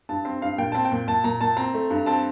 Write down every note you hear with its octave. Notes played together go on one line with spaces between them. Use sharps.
G2 A5
C4
G2 F5
A#2 G5
C4 A5
G5
A#2
A#2 A5
A#2 A#5
A#2 A5
C4 A#5
A3
G2
C4 A5